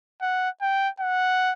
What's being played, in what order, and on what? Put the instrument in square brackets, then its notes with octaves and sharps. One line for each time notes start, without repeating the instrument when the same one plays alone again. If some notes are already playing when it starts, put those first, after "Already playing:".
[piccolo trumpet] F#5
G5
F#5